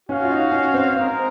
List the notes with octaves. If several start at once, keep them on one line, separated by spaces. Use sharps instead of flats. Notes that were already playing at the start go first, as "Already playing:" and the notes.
C#4 F#4 C#5 F5
F4
D#4
C#4
C4
G#3 C4 D#4 A#4